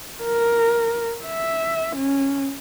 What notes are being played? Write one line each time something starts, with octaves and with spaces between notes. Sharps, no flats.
A#4
E5
C#4